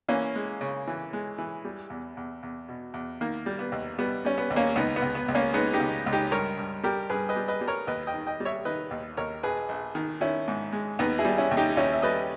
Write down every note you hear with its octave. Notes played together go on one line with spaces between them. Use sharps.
E3 A#3 C#4
G#3
C#3
E3
G#3
E3
G3
E2
E2
E2
B2
E2
D#3 A#3
G3
B3
D#2
G3 B3
G3 C#4
B3
D#2
A#3 C#4
C#2 B3 D#4
B3
C#2
B3
C#2
A#3 C#4
G#3 B3 D#4
D#4 G4
C#2
C#2
D#4 G4
G2 A#4 C#5
G2
G3 G4 A#4
G2 G#4 B4
B4 D#5
G3
B4 D#5
G3
A#4 C#5
D#2 B4 D#5
D#5 G5
D#3
D#5 G5
G3
C#5 E5
D#3 B4 D#5
D#2
D#2 A#4 C#5
A#1 G#4 B4
A#1
D#3
D#3 C#4 E4
G#2
G#3
D#2 B3 D#4
E4 G#4
G3
C#4 E4
D#2
D#4 G4
D#2 C#4 E4
E5
G3 B4 D#5